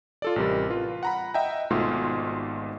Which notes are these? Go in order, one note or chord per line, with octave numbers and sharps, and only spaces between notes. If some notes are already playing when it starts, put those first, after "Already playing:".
F4 A4 D5
A1 C3 G3 A#4
F4 B4
F#5 A#5 B5
D#5 E5 F#5 G5 A#5
G#1 G#2 B2 A3 F4 C6